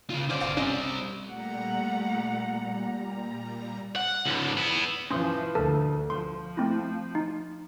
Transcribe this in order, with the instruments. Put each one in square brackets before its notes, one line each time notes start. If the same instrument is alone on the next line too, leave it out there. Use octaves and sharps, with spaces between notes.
[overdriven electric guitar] C#3 F4
[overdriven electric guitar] B3 D5 [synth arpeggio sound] C#4 C5
[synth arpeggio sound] G1 F5 A6
[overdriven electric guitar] G3 C4 [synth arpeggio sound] C#4 D5 D#5
[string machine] A#2 G3 A#5 [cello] A3 F#5
[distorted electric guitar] F#5
C#2 G#2
B3 E4
[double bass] E3 F3 [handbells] C#4 C6 D#6
[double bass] D2 [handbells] A4 A#4 A5
[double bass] F3 [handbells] C6
[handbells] A3 C4 E4
D#4